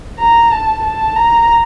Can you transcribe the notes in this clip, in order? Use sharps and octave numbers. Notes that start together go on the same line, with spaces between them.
A#5
A5
A5
A#5